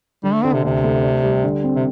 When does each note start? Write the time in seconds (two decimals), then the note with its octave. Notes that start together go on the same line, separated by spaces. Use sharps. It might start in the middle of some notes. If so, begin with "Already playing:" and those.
0.23 D3 G3
0.34 A3
0.44 D3 C4
0.53 C3
0.64 D2 C3
0.84 A3
1.03 D4
1.23 G3
1.44 D3
1.64 C4
1.76 C3